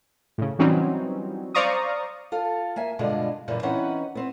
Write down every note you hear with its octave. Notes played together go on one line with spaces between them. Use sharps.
A2 C#3
E3 F#3 G3 C4 C#4 D#4
C5 D5 F5 A#5 C#6 D#6
F4 A4 F5
A#3 E5 G#5
G2 B2 D3 G#3 F4
F#2 A#2 C#3 E3 G3
E3 C4 C#4 D#4 B4 F#5
B3 C4